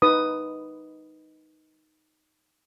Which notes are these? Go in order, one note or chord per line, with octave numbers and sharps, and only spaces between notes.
D#4 B4 D#6